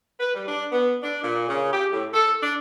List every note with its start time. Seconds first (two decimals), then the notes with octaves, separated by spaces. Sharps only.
0.20 B4
0.35 G3
0.47 D4
0.72 B3
1.03 D4
1.23 A#2
1.48 C#3
1.72 G4
1.92 A2
2.13 A4
2.42 D4